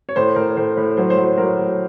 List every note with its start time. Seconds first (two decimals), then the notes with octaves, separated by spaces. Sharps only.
0.09 C#5
0.16 A2 C5
0.36 A2 A#4
0.57 A2 C5
0.77 A2
0.97 F#3 C5
1.10 C5
1.17 F#3
1.24 C5
1.38 F#3 A#4
1.59 A2